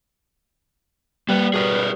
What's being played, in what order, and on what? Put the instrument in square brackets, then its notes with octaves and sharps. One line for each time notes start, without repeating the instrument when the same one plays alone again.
[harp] G3 [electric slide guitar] A#3 B4
[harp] B2 D#6 [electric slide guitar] G#4 A#4 B4